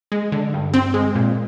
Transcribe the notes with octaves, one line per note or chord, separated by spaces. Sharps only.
G#3
D3
G2
C4
G#3
A#2